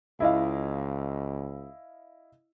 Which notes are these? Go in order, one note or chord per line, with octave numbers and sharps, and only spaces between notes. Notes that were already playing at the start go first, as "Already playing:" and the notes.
C#2 E4 D#5 F5